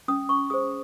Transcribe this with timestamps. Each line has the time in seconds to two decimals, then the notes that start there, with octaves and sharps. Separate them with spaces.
0.08 C#4 D#6
0.29 C#6
0.50 G#4 C5 D#6